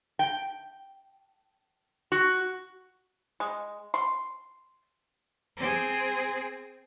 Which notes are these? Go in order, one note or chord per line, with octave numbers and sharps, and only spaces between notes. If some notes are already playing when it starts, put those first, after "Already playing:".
G5
F#4
G#3
C6
C4 G#4